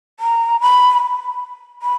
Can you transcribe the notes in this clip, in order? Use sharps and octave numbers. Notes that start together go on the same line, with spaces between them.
A#5
B5
B5